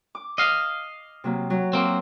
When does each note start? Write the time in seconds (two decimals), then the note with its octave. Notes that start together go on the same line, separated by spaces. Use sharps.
0.15 D6
0.38 D#5 F5
1.24 C3 F#3 A#3
1.50 F#3
1.73 A#3 C4